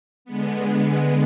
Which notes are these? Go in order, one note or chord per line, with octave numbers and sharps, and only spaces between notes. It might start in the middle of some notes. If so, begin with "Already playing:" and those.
D3 G#3 B3